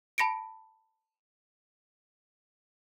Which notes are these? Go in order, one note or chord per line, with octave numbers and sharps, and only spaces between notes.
A5 B5 A#6 C#7 D7